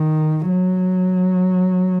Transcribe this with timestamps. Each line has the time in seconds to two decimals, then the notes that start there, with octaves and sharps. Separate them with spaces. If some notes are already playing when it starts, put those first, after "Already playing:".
Already playing: D#3
0.49 F#3